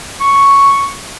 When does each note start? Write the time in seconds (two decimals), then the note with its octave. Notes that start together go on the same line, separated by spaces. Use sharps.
0.20 C#6